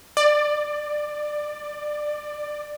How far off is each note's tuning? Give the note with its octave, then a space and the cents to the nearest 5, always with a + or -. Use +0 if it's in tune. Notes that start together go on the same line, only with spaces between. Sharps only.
D5 +20